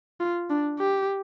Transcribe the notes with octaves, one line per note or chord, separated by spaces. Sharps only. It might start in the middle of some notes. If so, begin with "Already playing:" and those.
F4
D4
G4